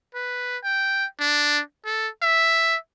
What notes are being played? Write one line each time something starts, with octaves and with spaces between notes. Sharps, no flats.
B4
G5
D4
A4
E5